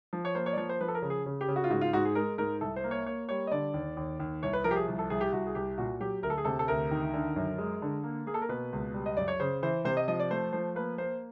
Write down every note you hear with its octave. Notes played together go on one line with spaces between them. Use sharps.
F3
C#5
A#3 C5
C#5
D5
F3 C#5
C5
F3 B4
A4
A#4
C#3
G#4
C#3
G4
C#3
F#4
F4
G#2 F#4
F4
G#2 F#4
G#4
G#3 A#4
G#2 A#4
C2 A4
C5
A#3
C#5
A#3 C#5
G3 C#5
D#5
D3 D5
D#2
D#2
D#2
C2 C#5
B4
F3 A#4
G4
G#4
C2
A4
C2 G#4
G4
C2 F#4
G#4
C2 G4
A#2 F#4
F#3 G4
D2 A#4
A4
G#4
C3 A4
A4
D2 A#4
D#3
D3
F#2
G#3
D3
A#3
A#3 G#4
A4
A#4
B2 B4
C#2
G3
D#5
F#2 D5
C#5
C#3 C5
E3 C5
C3 C5
D#5
F3 D#5
D5
A3 C5
F3 C5
A#3 B4
A#3 C5